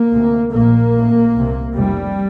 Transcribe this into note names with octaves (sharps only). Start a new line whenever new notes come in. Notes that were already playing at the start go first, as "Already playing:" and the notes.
Already playing: A#3
D2 C3
A#1 A#2 A#3
A1 A2
C2 C3
F1 F2 C3 G3